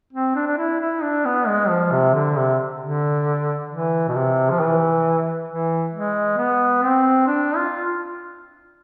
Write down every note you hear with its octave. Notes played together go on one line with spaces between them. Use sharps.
C4
D4
D4
E4
E4
D4
B3
G#3
F3
C3
D3
C3
D3
E3
B2
C3
F3
E3
E3
G#3
B3
C4
D4
F4